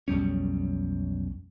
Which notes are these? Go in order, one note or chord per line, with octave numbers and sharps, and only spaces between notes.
B1 F2 G3 C#4